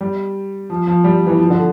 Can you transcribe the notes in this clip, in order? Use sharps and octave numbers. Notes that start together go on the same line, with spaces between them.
G3
F3
F3
G3
F3
E3
F3
D3